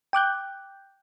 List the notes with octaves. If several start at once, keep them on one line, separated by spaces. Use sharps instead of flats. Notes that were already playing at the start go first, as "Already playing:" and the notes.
G5 D6 F#6 G6